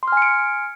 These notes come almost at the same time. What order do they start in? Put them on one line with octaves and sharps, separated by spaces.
C6 F6 G#5 C#7 D7